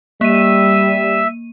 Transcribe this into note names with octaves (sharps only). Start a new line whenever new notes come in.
G3 A#3 E5 E6 D#7